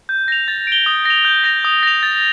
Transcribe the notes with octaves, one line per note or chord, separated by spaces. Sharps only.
G6
A#6 F7
A6
D7 G7
D#6
A#6 F7
G6
A#6 F7
D#6
A#6 F7
A6